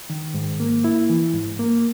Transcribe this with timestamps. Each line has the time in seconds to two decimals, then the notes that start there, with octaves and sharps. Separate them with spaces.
0.10 D#3
0.34 G#2
0.60 A#3
0.84 E4
1.10 E3
1.34 G#2
1.59 A#3